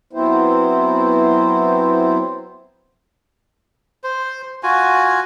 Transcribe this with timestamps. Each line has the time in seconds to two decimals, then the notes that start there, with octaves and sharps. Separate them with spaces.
0.13 F#3 B3 C4 E4 C5
4.04 C5
4.63 F4 F#4 G#5